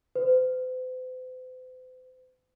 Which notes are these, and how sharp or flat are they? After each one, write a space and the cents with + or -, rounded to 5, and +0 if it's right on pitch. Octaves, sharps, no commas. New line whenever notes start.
C5 -45